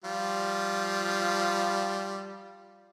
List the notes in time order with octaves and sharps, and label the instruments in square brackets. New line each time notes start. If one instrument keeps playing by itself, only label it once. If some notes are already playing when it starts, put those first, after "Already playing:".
[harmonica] F3 G3 F4